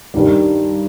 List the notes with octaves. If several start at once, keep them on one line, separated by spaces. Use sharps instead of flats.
G2 D#3 G3